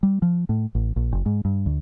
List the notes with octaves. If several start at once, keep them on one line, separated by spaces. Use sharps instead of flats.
G3
F3
A2
A1
A#1
F#1
G#2
G2
D2